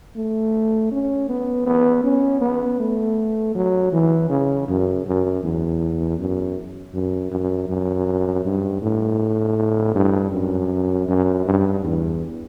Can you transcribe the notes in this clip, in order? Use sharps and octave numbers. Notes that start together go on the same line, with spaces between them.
A3
C#4
B3
B3
C#4
B3
A3
F#3
E3
C#3
F#2
F#2
E2
F#2
F#2
F#2
F#2
G2
A2
G2
F#2
F#2
G2
E2